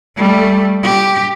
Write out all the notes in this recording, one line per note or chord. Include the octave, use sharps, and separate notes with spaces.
G3 A3
G4